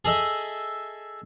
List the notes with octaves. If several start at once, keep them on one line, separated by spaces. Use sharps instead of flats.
G#4 A4 D#5 E5